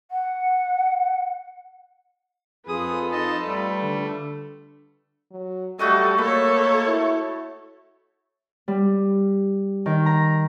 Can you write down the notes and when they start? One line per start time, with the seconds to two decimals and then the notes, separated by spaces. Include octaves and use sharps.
0.11 F#5
2.68 F2 F4 G#4 A4 B4 D#6
3.11 D#4 D#5 A5
3.45 G3 A3
3.82 D3
5.32 F#3
5.79 G3 A3 F#4 A4 D#5
6.18 A#3 A4 C#5 B5
6.87 E4
8.68 G3
9.86 D#3
10.06 A#5